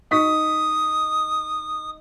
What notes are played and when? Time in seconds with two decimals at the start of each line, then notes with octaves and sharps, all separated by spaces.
0.11 D#4 C#6 D#6 B6